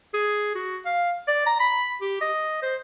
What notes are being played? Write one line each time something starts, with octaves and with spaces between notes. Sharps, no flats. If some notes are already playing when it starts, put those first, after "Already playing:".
G#4
F#4
F5
D5
A#5
B5
G4
D#5
C5